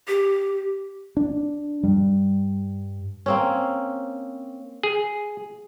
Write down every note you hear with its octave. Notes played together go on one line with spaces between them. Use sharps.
G4
D4
G2 G3
A#3 C4 C#4
G#4